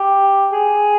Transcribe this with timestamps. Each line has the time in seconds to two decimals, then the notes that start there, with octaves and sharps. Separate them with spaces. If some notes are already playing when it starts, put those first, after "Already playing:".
Already playing: G4
0.53 G#4